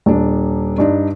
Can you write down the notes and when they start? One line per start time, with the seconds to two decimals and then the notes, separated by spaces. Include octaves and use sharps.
0.06 D#1 D4
0.78 G2 D4 D#4